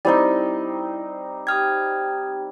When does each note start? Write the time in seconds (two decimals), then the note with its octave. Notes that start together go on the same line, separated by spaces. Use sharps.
0.05 G3 C4 D#4 E4
1.47 G4 G5 D#6 F6 G#6